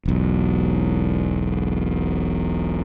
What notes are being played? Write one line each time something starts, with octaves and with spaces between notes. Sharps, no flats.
E1 B1